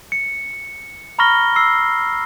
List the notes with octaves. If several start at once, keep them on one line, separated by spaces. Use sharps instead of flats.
C#7
A#5 B5 C#6 F6 A#6 G7
E6 C7